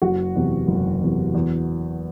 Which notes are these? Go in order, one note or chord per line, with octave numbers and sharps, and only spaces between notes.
F#1 F#4
E2 C3
F#1
E2 C3
E2